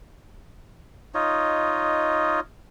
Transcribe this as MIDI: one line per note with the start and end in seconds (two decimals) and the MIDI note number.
1.15 2.40 63
1.15 2.40 65
1.15 2.40 73
1.15 2.40 75